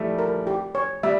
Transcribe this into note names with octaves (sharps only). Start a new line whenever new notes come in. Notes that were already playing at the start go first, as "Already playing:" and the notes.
Already playing: E3 F3 G3 A3 E5
A#4
G4
C#5
G3 E5